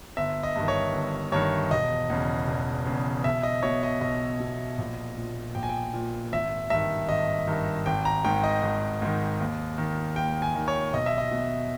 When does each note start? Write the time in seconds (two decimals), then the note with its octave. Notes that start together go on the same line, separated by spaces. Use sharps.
0.17 G1 E5
0.43 D#5
0.56 G2 D#3
0.68 C#5
0.94 G1
1.32 G2 D#3 C#5
1.71 E1 D#5
2.10 E2 C#3
2.48 E1
2.86 E2 C#3
3.24 B1 E5
3.43 D#5
3.63 B2 C#5
3.83 D#5
4.01 B1 D#5
4.40 B2
4.78 A#1
5.18 A#2
5.55 A#1 G5
5.63 G#5
5.69 G5
5.94 A#2
6.32 G#1 E5
6.70 G2 D#3 E5
7.09 G#1 D#5
7.47 G2 D#3
7.86 G#1 G5
8.05 A#5
8.25 G#2 D#3 G5
8.44 D#5
8.63 G#1
9.02 G#2 D#3
9.40 D#2
9.78 D#3
10.16 D#2 G5
10.42 G#5
10.55 D#3
10.68 C#5
10.94 B1 D#5
11.06 E5
11.18 D#5
11.31 B2